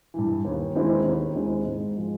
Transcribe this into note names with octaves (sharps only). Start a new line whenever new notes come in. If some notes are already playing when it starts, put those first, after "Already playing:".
G2 E3
D#2
D#3 G#3 C4 E4
D#2
D#3 G#3 C4 E4
G#2
F3 G#3